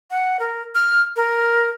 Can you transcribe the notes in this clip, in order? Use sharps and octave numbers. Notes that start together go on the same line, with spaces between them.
F#5
A#4
F6
A#4